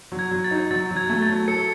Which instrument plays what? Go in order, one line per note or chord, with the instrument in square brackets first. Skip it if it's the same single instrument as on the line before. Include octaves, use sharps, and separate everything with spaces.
[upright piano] F#3
[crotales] G#6
[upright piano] F#3
[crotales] A6
[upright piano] D#4
[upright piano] F#3 [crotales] A6
[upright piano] F#3
[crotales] G#6
[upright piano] A3
[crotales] A6
[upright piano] F#3
[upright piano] A4 [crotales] C#7